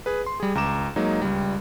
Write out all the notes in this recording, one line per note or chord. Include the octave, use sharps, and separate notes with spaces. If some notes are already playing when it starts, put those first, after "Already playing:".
G#4 B4
C6
G3 G#4
C#2 A#5 D6 E7
F#3 G#3 A#3 D#4
C#2 G3